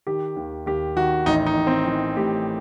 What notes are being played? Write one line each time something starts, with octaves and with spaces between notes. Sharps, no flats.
D#3 G4
D#2
D#2 G4
D#3 F#4
A1 D#4
D#4
A1
C4
E3 D#4
A2 G4